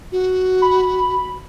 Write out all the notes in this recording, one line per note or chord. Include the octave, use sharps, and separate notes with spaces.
F#4
B5